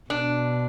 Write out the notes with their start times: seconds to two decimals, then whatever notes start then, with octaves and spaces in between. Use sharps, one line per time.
0.10 B2 D4